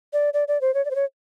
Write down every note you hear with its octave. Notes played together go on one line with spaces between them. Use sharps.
D5
D5
D5
C5
C#5
D5
C5
C#5